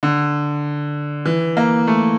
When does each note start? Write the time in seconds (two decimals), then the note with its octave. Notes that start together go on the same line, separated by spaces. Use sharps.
0.03 D3
1.25 E3
1.57 A#3
1.87 A3